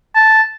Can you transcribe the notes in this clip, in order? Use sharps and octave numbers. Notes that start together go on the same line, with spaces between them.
A5